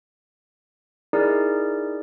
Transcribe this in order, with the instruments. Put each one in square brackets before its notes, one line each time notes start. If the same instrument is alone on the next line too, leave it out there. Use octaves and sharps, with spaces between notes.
[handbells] D#4 E4 G#4 A#4 D5 A#5